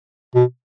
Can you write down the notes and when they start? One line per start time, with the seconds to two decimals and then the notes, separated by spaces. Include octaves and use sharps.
0.35 B2